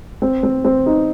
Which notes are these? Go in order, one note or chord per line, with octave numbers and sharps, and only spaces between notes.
C4
C4
C4
D#4